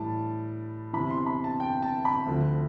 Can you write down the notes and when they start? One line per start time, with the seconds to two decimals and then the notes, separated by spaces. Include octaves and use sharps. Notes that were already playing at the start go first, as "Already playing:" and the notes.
Already playing: A2 E3 G3 A5
0.93 E2 C3 E3 B5
1.11 C6
1.26 B5
1.44 A5
1.60 G5
1.82 A5
2.05 B5
2.26 D2 D3 F3